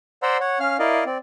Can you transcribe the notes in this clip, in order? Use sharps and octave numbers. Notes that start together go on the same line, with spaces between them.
C5 D5 F#5 A#5 C6 E6
C#5 F#5
C#4 F5 F6
E4 A#4 D5 D#5 F5
C4 D5